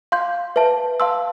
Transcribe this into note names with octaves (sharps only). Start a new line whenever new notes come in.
F5 C6 G6
B4 E5 A5
F5 A5 C6 E6